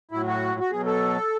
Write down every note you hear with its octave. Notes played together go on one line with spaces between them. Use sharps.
A2 F#3 E4
F#4
F#4
B2 F#3 G#4
A4